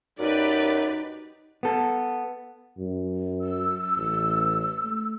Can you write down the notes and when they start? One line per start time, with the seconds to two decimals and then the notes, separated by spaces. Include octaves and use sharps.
0.19 F#2 D#4 G4 B4 D5
1.63 B3 A4
2.78 F#2
3.41 E6
3.97 A1
4.84 A3